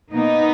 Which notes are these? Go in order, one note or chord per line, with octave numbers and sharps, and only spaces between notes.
B2 A#3 B3 D#4